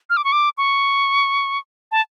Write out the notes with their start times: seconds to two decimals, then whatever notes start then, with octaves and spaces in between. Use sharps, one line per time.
0.10 F6
0.17 D6
0.25 C#6
0.32 D6
0.58 C#6
1.92 A5